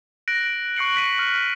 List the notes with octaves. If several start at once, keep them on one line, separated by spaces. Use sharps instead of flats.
F#6 A#6 D7 F#7
C#6 F#6 C7 C#7 F#7
B6 D#7 F#7
F6